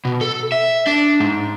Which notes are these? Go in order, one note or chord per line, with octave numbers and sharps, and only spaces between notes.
B2
A4
E5
D4
G#2